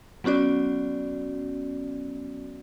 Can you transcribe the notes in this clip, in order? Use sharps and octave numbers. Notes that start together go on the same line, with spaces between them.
F#3 B3 C#4 F#4 D5